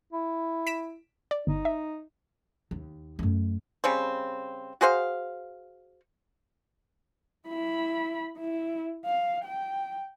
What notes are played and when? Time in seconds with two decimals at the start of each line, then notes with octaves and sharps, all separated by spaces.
0.12 E4
0.67 B6 D7 E7
1.31 D5
1.47 G1 D#4
1.65 E5
2.71 D#2
3.19 F#2 A3
3.84 C#3 G3 C4
4.81 F#4 G#4 C5 F5
7.48 E4 B5
8.38 E4
9.05 F5
9.44 G5